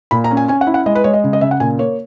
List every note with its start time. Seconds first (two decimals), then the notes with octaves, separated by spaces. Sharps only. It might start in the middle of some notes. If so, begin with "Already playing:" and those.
0.11 A#2 B5
0.24 A#5
0.31 C#4
0.37 G#5
0.48 C#4 G#5
0.61 F#5
0.67 E4
0.74 F#5
0.86 G#3 D#5
0.95 B4
1.04 G#3 C#5
1.14 D#5
1.24 C#3
1.33 D#5
1.41 C#3 E5
1.51 F#5
1.60 A#2 G#5
1.79 A#3 C#5